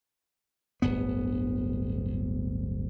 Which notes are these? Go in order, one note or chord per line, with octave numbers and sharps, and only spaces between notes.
D1 G1 B3